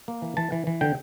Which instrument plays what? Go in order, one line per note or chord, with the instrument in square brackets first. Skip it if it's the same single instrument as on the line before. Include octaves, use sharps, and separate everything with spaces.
[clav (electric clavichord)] A#3
E3
E3 A5
E3
E3
D3 G5